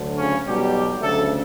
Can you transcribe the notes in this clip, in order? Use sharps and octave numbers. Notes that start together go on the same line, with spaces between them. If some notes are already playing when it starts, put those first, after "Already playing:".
Already playing: D2 D3 F#3
C#3 C#4
B1 B2 F#3 G3 G4
D2 C#3 F#3 A3 A4